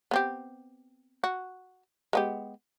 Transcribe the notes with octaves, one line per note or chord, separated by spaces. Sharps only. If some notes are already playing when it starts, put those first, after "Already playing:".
B3 C4 G4
F#4
G#3 B3 G4